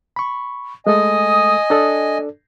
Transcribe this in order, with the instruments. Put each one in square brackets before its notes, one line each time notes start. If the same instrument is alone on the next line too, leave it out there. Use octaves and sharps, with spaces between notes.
[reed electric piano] B5 C#6
[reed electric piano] G#3 A3 A4 [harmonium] D#5 G#5 [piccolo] D#6
[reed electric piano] D4 A4 D5